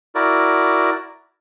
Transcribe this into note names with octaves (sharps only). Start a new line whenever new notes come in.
E4 F#4 A#4 D5